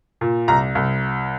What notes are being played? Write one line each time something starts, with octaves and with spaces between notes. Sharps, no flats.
A#2
C2 A#5
C2